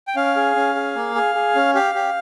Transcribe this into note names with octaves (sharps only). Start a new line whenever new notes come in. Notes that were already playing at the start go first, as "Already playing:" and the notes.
G5
C#4 F5
G#4
C#4
G#4
A#3
G#4
G#4
C#4
G4 F5
G4